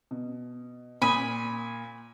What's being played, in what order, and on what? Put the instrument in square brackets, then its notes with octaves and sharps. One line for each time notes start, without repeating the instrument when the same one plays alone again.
[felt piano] B2
[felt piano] A#2 D#6 [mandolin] G#5 B5